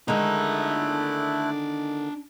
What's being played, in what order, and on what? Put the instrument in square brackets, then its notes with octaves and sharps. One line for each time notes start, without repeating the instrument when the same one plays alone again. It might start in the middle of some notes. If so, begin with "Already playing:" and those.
[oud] D3 D#3 [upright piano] G#3 [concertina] A3 E4 F#6 [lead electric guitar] D4 A#5